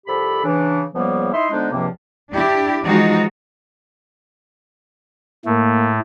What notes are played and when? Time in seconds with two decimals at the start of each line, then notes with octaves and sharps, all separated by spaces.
0.07 C2 F3 G4 A4 B5
0.44 C#3 E3 D4
0.94 C#2 C#3 F3 G3 A#3 B3
1.33 D#4 E4 E5 C6
1.51 D3 F3 G#3 B3 D4 D#4
1.72 C#2 G2 C3 F3 A#3 C4
2.31 D4 E4 G4
2.84 E3 F3 G#3 D#4 F4 F#4
5.45 A2 A3 A#3